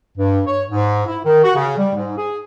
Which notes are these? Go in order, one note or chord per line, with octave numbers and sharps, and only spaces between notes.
G2
C#5
G#2
E4
D#3
F#4
C#3
G3
G#2
G#4